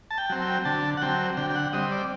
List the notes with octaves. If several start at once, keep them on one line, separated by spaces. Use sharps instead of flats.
A5
G5
F#3 C4
G5
D3 A5
F#5
F#3 C4 G5
D3 G5
G5
F#5
G3 C4 D#5
D5